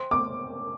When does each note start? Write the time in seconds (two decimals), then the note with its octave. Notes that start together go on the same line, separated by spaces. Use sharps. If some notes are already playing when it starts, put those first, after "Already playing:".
Already playing: C5 G5 C6
0.11 D6